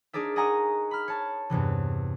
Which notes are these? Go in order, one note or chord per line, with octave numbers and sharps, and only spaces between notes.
D4 D#4 G#4 A#4 D5 E5
D#5 F#5 G#5 A#5 C#6 D#6
B5 F6
C#5 A5
E2 G2 C3 E3